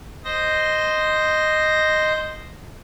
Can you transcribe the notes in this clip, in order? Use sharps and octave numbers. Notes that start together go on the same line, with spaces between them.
C5 D#5 A#6